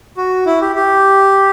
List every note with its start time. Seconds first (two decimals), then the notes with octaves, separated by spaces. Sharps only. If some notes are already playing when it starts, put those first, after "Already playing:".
0.17 F#4
0.46 E4
0.61 G4
0.75 G4